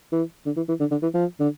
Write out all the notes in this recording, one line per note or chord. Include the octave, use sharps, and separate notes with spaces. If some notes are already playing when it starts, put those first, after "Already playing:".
E3
D3
E3
E3
D3
D3
E3
F3
D3